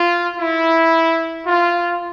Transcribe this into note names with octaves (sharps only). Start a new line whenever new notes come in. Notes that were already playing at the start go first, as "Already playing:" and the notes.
Already playing: F4
E4
F4